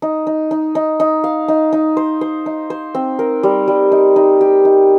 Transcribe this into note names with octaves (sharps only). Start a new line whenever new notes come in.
D#4
D#4
D#4
D#4
D#4
F5
D#4
D#4
C5
C5
D#4
C5
C4
A#4
G3
G3
D#4
D#4
G4
D#4